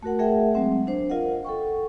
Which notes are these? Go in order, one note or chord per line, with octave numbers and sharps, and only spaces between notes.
A3 F#4 A#4 F#5
A3 G#4 A#4 E5 F#5 G5
F#3 G#3 C4 F#5
D4 C5
F4 A#4 D#5 F5 F#5
A4 F#5 G5 C#6